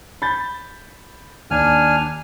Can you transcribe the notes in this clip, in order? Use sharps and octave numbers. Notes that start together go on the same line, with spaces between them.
B5 G6 A6
D#2 D4 G#5 F6